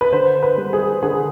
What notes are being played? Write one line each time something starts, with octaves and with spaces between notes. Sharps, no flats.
B4
D3 C5
B4
G3
G#4
D3 G#4